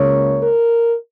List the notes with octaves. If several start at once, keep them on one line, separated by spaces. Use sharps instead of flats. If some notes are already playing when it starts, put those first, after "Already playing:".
Already playing: C#2 C#3 A#3 C#5
A#4